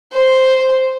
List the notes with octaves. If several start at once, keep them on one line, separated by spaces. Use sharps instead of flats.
C5